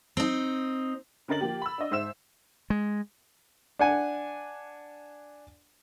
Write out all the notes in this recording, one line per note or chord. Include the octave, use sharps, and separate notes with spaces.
C4 D#4
D3 C#4 A#4 D#5 A6 F#7
F3 A#3 G4
B5 E6
D4 D#5
G#2 C5 E5 E6 E7
G#3
D4 F#5 G#5